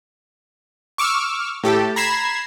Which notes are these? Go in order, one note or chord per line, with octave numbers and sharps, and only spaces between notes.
C#6 D6 E6 F6
A2 G4 A4
A#5 B5 G#6 C7 E7